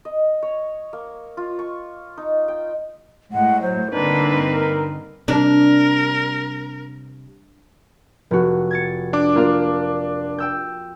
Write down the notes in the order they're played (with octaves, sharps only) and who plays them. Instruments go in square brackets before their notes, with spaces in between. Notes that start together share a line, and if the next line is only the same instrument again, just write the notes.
[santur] D#5
C#5
A#3
F4
C#6
D#4
G5
[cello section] A2 [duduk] G#3 [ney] F#5
[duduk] F#3 [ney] C5
[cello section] G2 D3 C4 [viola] A#3 B4 [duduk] D4 [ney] D#4
[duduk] A#4
[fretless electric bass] C3 G3 [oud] D4 [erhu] A#4
[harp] F1 F#4
G#6 A6 C#7
[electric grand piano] D4 D6
[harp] A#3 F4 F5
G5 E6 G6